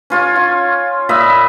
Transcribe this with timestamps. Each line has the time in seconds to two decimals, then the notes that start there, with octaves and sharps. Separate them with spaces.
0.10 C#4 F4 C#5
0.36 F4
1.09 A#2 D#5 E5 B5